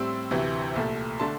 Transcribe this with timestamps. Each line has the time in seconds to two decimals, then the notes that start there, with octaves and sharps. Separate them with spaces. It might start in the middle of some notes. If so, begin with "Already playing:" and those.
Already playing: A2 G3 C4 C6 E6
0.31 D2 C3 E3
0.76 C2 A#2 A3
1.19 D3 A3 D4 A5 C6